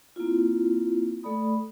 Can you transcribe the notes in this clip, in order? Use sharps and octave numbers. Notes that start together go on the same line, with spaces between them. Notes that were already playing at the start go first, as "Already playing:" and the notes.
A#3 C4 E4 F4
A3 A4 D5 B5 D#6